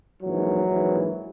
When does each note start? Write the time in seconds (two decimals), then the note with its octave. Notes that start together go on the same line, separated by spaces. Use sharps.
0.22 A#1 G#2 E3 F#3
0.65 A#1 G#2 E3